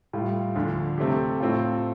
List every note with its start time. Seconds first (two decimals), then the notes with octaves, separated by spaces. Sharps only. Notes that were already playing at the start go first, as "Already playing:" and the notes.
0.13 A2 G3 F4
0.55 D2 D3 F3
0.98 C3 A3 C4 G4
1.40 A2 A3 C4 F4